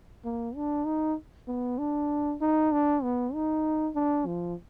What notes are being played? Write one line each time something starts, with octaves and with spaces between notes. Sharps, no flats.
A#3
D4
D#4
B3
D4
D#4
D4
B3
D#4
D4
F3